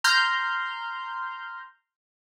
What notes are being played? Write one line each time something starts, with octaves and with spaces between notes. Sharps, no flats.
A#5 C6 F6 G6